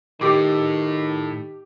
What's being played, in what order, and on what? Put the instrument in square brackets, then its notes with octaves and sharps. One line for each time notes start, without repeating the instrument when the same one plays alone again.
[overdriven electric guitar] A2 [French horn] D#3 [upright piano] G4 D6